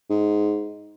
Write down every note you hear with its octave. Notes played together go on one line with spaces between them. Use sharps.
G#2